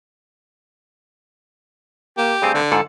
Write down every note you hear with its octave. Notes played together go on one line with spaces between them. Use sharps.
A#3 G4
G2 A3 C4 G#4
D3 D4
G#2 F4 A4 F#5